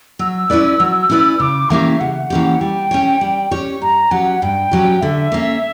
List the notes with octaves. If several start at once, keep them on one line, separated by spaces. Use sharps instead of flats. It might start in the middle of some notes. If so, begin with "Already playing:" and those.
F#3 E6
C#4 E4 B4 D5
F#3
C#4 E4 B4 D5
C#3 D6
E3 A#3 C#4 G4 E5
C#3 F#5
E3 A#3 C#4 G4
G3 G5
C#4 G4 C#5
G3
C#4 G4 C#5
G2 A#5
F#3 C#4 G4 F#5
G2 G5
F#3 C#4 G4
D3 E5
A#3 C#4